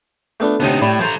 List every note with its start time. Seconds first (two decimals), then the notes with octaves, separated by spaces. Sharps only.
0.40 A3 B3 D4 F4 A4 A5
0.60 D2 C3 B3 D#4 C#5 A5
0.81 A2 G3 E5 B5 C#6
1.00 F3 G4 A4 C5 D5 A#5